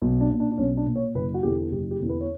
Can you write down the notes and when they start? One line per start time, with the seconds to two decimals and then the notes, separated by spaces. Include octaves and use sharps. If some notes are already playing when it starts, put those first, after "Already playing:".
0.02 B1
0.21 D4
0.30 A#2
0.40 D4
0.51 D4
0.58 B1 C#4
0.77 D4
0.86 A#2
0.96 C#5
1.14 F#1 B4
1.34 F#4
1.43 E2 D3 G4
1.71 F#1 G4
1.91 G4
2.00 E2 D3
2.09 B4
2.21 C#5